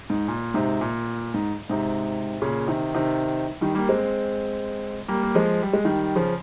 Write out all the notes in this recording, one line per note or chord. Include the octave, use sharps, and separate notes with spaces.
G#2
A#2
G#2 C3
A#2
G#2
G#2 C3
A#2 C#3
C3 D#3
C3 D#3
D#3 G3
G3 A#3
G#3 C4
G3 A#3
A#3
F3 G#3
G3
G#3
D#3 G3
C#3 F3